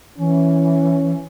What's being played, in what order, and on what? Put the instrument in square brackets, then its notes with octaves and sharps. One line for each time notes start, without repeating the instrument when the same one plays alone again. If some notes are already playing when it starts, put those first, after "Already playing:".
[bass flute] E3 [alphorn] C#4